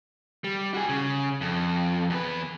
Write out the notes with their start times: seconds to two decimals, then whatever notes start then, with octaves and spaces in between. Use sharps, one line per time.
0.44 G3
0.74 F#4 G#4
0.89 C#3
1.41 F2
2.10 E2 B4